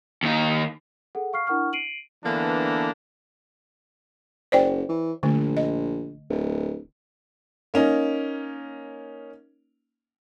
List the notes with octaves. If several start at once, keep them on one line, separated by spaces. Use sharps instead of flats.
D#2 D#4
G#4 A4 F#5
F5 C#6 F6 C7
D4 E4 A#4 F#5 C#6 F6
C7 D7 D#7 F#7
D3 E3 A#3 B3 D4
F#1 C5 D5 G5
E3
A#1 D3 A3
D#5
D1
A#3 C#4 D#4